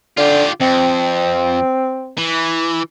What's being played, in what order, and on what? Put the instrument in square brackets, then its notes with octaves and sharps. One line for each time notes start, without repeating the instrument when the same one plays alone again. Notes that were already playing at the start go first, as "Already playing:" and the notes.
[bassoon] D3 [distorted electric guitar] F4 G4
[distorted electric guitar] F2 [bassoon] C4
[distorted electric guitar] E3